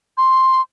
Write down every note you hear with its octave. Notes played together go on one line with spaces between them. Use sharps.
C6